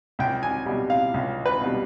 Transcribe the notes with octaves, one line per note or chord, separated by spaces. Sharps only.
C#2 G5
G#5
B2 G3
F5
C#2
B4
B2 G3